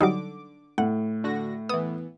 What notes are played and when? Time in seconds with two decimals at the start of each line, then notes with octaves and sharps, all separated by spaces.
0.01 D3 F#3 G3 D#4 D6
0.78 A2 F#5
1.24 D3 F#4 A#6
1.69 E3 B3 D#6